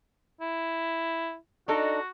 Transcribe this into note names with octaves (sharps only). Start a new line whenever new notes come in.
E4
D4 D#4 F#4 A4